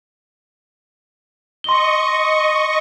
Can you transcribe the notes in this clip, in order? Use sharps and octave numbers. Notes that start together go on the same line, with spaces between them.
D#5 C6 C#6 G7